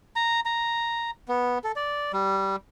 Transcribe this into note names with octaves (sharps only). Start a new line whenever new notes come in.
A#5
A#5
B3
A4
D5
G3